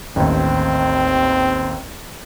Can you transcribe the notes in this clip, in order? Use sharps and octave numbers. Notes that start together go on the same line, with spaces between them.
A1 D#2 C4